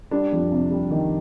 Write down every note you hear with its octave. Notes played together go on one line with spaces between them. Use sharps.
G3 D4
F2
C3
G3
D#3